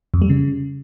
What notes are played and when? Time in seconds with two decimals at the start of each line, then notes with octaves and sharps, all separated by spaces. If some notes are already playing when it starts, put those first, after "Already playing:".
0.14 F2
0.22 G3
0.30 C#3